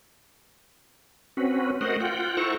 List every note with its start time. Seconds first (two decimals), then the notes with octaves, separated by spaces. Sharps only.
1.37 C4 C#4 F#4 B4
1.81 A3 F#4 A#4 C5 D#5 F#5
2.00 F4 F#5 G5
2.37 E4 A4 C5 F#5 A#5 C#6